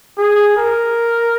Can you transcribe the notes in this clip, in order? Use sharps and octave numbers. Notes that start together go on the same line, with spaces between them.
G#4
A#4